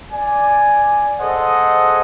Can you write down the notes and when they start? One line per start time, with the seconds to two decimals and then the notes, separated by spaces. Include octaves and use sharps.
0.12 D5 G#5
1.20 G#4 A4 C5 D#5 F#5